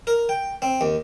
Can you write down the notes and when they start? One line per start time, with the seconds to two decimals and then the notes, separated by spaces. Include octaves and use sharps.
0.07 A#4
0.29 G5
0.62 C4
0.81 D#2